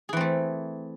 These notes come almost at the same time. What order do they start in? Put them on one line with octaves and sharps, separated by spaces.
G#4 E3 C4 A3